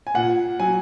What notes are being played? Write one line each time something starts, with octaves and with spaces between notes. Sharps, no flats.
G#5
A#2 F#5
F#3 G#5